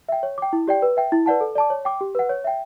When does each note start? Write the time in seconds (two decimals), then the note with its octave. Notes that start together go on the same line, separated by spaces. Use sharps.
0.09 E5 G5
0.23 C#5
0.38 G5 D6
0.53 E4
0.68 G4 D5 G5
0.82 B4
0.97 E5 G5
1.12 E4
1.26 B4 D5 F#5 A5
1.41 A4
1.55 D5 A5 D6
1.70 C#5
1.85 G5 D6
2.01 G4
2.15 B4 F#5
2.29 C#5
2.44 E5 G5